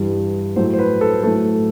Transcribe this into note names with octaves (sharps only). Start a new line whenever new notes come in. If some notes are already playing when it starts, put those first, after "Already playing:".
Already playing: G2 E3 G3
A2 F#3 A3 C5
C5
B4
A4
A2 F#3 A3 A4